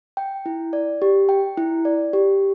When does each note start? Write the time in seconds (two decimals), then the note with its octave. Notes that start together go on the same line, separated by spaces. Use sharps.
0.17 G5
0.46 E4
0.73 D5
1.02 G4
1.29 G5
1.57 E4
1.85 D5
2.13 G4